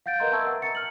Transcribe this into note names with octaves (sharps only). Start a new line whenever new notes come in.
F5 F#5 G6 A6 D7
A#4 B4 D#5 A#5 C6 G6
E5 A5 A#5 C#6 E6 G#6
A#4 F#5
A#5 A6 C#7
F6 F#7